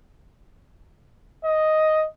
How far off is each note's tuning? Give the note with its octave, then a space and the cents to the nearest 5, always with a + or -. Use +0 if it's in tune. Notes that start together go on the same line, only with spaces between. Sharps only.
D#5 +5